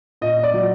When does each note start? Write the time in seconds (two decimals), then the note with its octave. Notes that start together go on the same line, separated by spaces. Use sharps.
0.21 A#2 D#5
0.43 D5
0.54 F#3